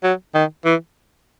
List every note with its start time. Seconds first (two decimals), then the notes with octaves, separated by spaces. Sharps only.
0.03 F#3
0.35 D#3
0.65 E3